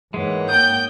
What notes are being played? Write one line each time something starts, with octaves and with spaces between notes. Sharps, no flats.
G#2 E3 G#3 A#3 C#5 F#5
G5 D#6 G6